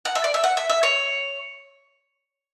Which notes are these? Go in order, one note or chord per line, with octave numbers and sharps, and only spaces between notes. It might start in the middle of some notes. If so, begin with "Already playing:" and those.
F#5
E5
D5
E5
F#5
E5
E5
C#5